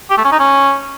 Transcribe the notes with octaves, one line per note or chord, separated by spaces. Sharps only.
G4
A3
C#4
D#4
C#4